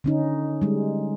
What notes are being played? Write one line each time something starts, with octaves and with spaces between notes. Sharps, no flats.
D3 C#4 D#4
G3 G#3